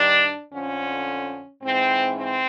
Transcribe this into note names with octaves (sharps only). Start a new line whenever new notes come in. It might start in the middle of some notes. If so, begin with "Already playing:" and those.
Already playing: G2 D#3 D4
F2 D3 F3 C#4
G#2 E3 C4
C4